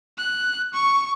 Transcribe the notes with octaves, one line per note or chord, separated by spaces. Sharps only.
F#6
C#6